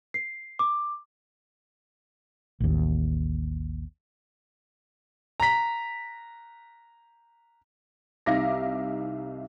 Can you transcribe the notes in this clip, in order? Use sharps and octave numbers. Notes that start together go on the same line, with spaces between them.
C7
D6
A1 D#2
A#5 B6
C2 D#4 E5 F5 D6 A#6